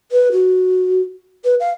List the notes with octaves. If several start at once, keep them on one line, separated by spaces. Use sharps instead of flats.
B4
F#4
B4
F5